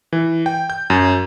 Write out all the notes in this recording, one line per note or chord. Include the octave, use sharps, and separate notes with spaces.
E3
G5
G6
F#2